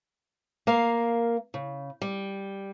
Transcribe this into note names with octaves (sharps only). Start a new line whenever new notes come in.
A#3 A#4 F5
C#3
G3